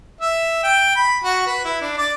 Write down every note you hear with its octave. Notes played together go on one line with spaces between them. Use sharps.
E5
G5
B5
F#4
B4
E4
D4
D5